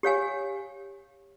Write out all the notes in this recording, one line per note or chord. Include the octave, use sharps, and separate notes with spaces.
G4 C#5 F5 G#5